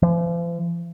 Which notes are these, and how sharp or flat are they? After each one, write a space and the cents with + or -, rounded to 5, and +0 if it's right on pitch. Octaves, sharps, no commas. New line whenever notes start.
F3 -45